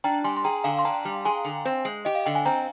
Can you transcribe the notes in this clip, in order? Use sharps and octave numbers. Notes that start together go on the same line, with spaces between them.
D4 G5 A#5
G3 G#5 C6
C6
G#4 G5 A#5
D3 F5 G#5
C6
D4 G5 A#5
G3
G#4 G#5 C6
D3
C4
G#3
G4 D#5
F5
D3 G5
G#5
C4 G5 A#5